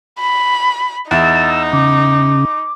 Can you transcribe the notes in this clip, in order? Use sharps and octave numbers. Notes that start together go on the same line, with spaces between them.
B5
E2 D#4 E6 A6
C#3 D6